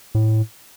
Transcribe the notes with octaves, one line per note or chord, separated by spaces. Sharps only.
A2